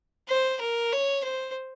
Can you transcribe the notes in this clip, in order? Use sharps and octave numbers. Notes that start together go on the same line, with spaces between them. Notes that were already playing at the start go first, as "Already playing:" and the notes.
C5
A#4
C#5
C5